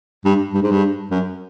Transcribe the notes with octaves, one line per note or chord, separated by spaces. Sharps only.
G2
G2
G#2
G2
F#2